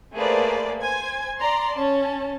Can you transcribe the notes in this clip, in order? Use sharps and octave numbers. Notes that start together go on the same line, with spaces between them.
A3 A#3 G#4 B4 C5 D5
C5 G#5 G#6
D5 A#5 C6
C#4 A5